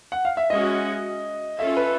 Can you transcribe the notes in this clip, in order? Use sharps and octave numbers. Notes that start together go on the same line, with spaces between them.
F#5
F5
E5
G#3 C#4 F#4 D#5
C#4 F4 A4 E5
B4